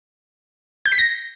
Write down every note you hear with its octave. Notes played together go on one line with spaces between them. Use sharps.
G6
B6
A#6